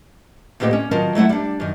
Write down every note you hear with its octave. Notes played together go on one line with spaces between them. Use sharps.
D2 A#2 B3 G4 D#5
C#4
D#3 F#3 F4 A#4 D#5 A5
F#3 A3 E4 F#5
G3 D4
F#2 D#3